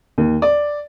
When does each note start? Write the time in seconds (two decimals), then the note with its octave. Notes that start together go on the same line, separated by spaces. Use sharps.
0.18 D#2
0.42 D5